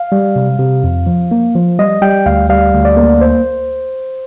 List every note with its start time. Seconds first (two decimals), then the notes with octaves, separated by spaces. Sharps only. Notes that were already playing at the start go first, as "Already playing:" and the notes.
Already playing: F5
0.12 G3
0.36 C3
0.59 C3
0.84 F2
1.06 F3
1.31 A#3
1.55 F3
1.79 G3 D#5
2.02 G3 G5
2.26 D2 F5
2.49 G3 F5
2.73 D2
2.85 D5
2.97 A#3
3.21 C5